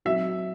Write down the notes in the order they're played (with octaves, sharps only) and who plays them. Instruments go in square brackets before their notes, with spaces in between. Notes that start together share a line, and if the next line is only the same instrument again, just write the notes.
[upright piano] F#3 C4 D#4 F#4 [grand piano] E5